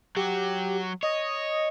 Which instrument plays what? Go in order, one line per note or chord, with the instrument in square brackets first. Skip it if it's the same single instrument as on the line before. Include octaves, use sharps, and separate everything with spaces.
[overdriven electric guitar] F#3 F#4 [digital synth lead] G4
[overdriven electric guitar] C#5 [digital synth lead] D#5